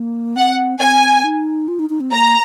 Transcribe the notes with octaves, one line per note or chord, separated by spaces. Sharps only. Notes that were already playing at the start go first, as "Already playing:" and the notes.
Already playing: A#3
C4 F#5
C4 G#5
D#4
F4
D#4
D#4
C4
A#3 A#5